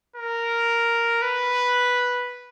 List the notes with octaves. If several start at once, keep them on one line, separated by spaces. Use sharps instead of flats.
A#4
B4